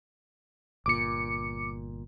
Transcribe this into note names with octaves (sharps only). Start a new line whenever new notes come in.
G1 A#2 D6 C#7